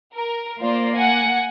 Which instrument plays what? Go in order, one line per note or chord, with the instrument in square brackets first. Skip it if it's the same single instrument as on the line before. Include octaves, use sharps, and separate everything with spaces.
[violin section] A#4
[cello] A#3 [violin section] F4 C5 D5
[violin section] F#5 G#5